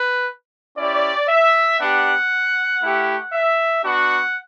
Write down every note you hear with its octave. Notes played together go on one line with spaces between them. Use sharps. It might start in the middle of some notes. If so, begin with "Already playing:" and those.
Already playing: B4
C#4 E4 G4 D5
E5
B3 D4 G4 F#5
A3 E4 G4
E5
B3 D4 F#4 F#5